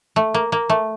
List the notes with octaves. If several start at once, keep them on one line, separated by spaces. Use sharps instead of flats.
A3
A#3
A#3
A3